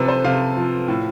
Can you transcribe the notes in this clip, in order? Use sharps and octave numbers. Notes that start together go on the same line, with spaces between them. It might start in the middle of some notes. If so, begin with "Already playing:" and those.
Already playing: C3 F3 A4 B4
C5
C3 F5
F3
A2